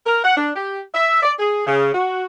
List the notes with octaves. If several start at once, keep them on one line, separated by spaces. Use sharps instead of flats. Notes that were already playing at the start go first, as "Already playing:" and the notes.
A#4
F#5
D4
G4
E5
D5
G#4
C#3
F#4